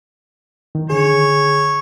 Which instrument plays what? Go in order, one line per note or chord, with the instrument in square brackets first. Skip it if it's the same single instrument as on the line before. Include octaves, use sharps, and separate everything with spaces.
[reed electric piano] D#3
[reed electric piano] D3 G#4 [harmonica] C#5